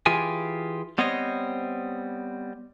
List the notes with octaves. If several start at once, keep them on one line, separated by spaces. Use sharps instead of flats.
E3 F4 G4 G#4 G#5
G3 B3 C4 C5 C#5 D#5